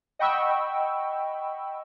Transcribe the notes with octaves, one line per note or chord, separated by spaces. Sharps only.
D#5 F#5 G5 B5 C#6 E6